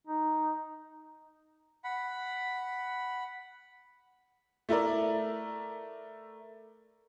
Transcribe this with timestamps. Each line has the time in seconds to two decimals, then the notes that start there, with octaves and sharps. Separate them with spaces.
0.07 D#4
1.84 F#5 B5
4.69 A3 E4 A#4 D5